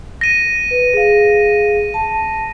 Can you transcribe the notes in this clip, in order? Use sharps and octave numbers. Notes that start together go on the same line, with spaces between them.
A#6 D#7
B4
G#4 F5
A5